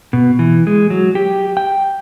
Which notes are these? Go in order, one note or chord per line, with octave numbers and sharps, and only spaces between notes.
B2
E3
G#3
F#3
G4
G5